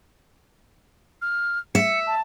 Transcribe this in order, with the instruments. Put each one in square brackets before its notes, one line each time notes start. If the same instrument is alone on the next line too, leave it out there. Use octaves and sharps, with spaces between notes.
[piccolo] F6
[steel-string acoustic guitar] E5 [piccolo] C#7
[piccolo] A5